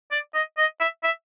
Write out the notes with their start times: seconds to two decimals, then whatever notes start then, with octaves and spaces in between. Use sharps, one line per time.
0.12 D5
0.34 D#5
0.58 D#5
0.80 E5
1.03 E5